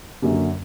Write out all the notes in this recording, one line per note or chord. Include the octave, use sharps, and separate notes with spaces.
F#2 D3 F#3 A#3